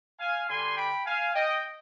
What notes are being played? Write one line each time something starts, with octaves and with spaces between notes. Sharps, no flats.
F5 G#5
D3 G3 D4 G#5 C6
G5 B5
F5 G#5
D#5 G5